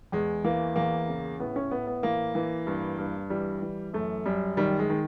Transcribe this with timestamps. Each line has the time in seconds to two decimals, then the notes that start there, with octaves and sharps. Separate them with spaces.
0.12 E2 G#3
0.44 E3 A#3
0.76 E2 A#3
1.08 C#3
1.40 A2 B3
1.56 C#4
1.71 A2 B3
1.87 B3
2.03 E3 A#3
2.35 E3
2.67 G2
2.98 G2
3.30 E3 G3
3.62 E3
3.93 F#2 A3
4.25 F#2 G3
4.57 D#3 G3
4.79 G#3
4.89 D#3